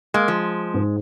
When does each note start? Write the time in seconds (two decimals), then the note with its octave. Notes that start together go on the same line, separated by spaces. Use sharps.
0.14 G#3 A#3
0.28 F3
0.74 G#2